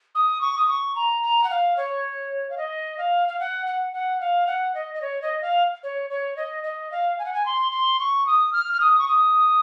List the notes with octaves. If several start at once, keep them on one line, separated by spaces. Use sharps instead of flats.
D#6
C#6
D#6
C#6
A#5
A#5
F#5
F5
C#5
F5
D#5
F5
F5
F#5
F#5
F#5
F5
F#5
D#5
D#5
C#5
D#5
F5
C#5
C#5
D#5
D#5
F5
G#5
F#5
G#5
C6
C6
C#6
D#6
F6
F6
D#6
C#6
D#6